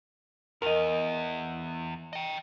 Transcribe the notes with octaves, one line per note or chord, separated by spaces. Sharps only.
E2 A#4 D#5
D#5 G5